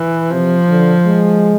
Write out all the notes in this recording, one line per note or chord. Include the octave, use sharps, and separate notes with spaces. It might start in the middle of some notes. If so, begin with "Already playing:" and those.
Already playing: E3
C3 F3
D3
G#3